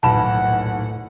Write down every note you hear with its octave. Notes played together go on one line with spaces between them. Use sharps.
D#1 B1 A2 F#5 A5 B5 E7